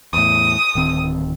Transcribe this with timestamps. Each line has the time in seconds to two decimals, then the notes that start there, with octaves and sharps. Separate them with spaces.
0.13 E2 A2 D#6
0.75 D1 D#3 C4